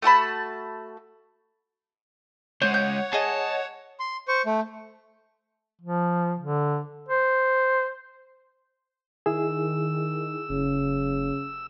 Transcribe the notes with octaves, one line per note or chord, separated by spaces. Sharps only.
A3 F#4 A5 B5
C#2 G#3 C5 C#5 F#5
G6
G#4 D#5 A5
C6
C5 C#6
A3
F3
D3
C5
D#3 E4 G#4 E6
F#1 C#3